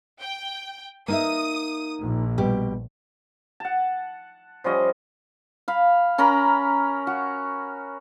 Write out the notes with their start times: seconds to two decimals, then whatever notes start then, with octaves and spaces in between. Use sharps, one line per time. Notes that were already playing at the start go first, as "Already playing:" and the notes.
0.21 G5
1.08 A#3 D#4 E5 D#6
2.01 A#1
2.38 B2 G3 G4
3.60 F#5 A5
4.64 F3 G3 C#4 D#5
5.68 F5 B5
6.18 C#4 A#4 A#5 B5
7.07 F#4